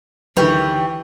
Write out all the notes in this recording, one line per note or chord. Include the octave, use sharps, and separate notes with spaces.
D2 D#3 E3 F#3 G4 B4 C#5